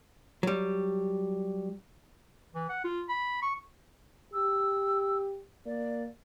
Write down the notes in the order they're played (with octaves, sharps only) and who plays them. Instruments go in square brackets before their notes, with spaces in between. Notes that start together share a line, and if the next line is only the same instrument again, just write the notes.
[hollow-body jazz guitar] F#3 G3
[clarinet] E3
F#5
F4
B5
C#6
[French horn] G4 [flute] E6
[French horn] A#3 [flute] D5